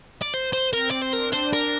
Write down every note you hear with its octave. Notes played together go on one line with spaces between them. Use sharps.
D5
C5
C5
C4 A#4
D5
C5
D4 A#4
C5
A#4